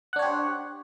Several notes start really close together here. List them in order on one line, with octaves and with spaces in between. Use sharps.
F#5 D4 C#5 G4 C5